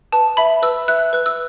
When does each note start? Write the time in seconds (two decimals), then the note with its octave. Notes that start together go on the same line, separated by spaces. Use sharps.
0.12 B4 A5
0.37 E5 B5
0.62 B4 E6
0.88 E5 F#6
1.13 B4 F#6
1.26 E6